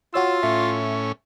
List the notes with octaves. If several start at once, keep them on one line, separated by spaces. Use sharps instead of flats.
F4 F#4 C#5 E6
A2 C#4 E5